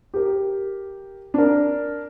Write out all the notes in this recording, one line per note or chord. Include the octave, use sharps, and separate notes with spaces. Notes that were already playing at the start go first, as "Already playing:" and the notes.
G4 A#4
D4 A#4